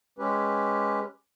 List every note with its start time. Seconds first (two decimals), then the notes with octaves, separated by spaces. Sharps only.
0.19 G#3 C#4 G4 B4